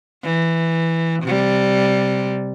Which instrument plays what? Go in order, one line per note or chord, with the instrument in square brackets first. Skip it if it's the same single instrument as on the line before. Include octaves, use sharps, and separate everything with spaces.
[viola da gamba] E3
C3 G3